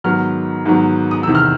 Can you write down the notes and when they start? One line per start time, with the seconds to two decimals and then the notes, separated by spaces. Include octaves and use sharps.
0.04 G#2 D#3 F#3 B3 F6
0.66 G#2 D#3 F#3 B3
1.11 D#6
1.23 E2 C3 D#3 E6
1.35 F6